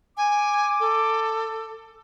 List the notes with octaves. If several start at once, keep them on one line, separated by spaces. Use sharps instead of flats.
G#5 D6
A4